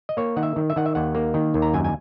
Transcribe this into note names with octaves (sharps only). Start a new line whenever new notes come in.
D#5
A#3 C#5
D#3 F#5
E5
D#3
E5
D#3 F#5
E5
D#2 F#5
A#3
D#3
D#2
A#5
F#2 G#5
G#5